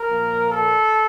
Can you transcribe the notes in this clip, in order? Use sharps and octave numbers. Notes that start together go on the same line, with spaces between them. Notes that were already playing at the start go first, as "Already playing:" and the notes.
Already playing: A#4
A#2 F3 A#3
A4